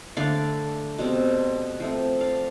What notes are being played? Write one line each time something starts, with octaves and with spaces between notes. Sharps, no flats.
D3 A3 D4 D5 F5
B2 G3 C4
F3 A3 C4
D5 F5